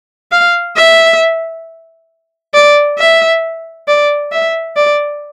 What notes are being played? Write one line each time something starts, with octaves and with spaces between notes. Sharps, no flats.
F5
E5
D5
E5
D5
E5
D5